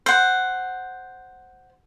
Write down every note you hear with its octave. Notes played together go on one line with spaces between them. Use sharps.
C5 F#5